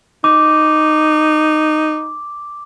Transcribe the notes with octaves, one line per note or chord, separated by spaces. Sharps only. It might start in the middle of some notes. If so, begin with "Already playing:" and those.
D#4 D6